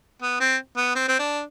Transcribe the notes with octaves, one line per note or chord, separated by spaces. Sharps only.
B3
C4
B3
C4
C4
D4